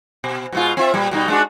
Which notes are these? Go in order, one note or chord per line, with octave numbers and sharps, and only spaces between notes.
B2
B2 G#3 F4
C4 F4 E5
A#2 G3
B2 G3 D#4
G#3 D4 F#4